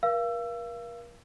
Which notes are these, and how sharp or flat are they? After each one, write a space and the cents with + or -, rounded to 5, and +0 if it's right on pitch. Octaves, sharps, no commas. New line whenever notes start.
A#4 +35 F5 -30 E6 +25